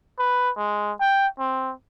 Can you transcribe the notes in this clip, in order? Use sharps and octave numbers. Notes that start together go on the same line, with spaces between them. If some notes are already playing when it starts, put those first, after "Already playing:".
B4
G#3
G5
C4